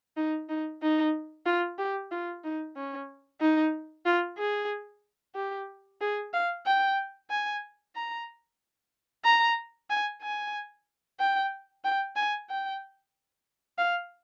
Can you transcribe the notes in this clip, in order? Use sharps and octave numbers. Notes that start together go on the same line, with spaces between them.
D#4
D#4
D#4
F4
G4
F4
D#4
C#4
D#4
F4
G#4
G4
G#4
F5
G5
G#5
A#5
A#5
G#5
G#5
G5
G5
G#5
G5
F5